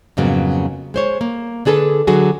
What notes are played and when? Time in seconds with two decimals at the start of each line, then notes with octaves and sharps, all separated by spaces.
0.17 F2 G#2 C#3 F#3 A#3 B3
0.94 G#3 C5 C#5
1.21 A#3
1.65 D3 D4 G#4 A4 B4
2.07 D3 F#3 F#4 G#4